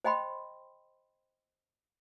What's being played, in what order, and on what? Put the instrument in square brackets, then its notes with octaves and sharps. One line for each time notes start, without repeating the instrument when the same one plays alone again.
[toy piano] C5 D#5 G5 B5 C6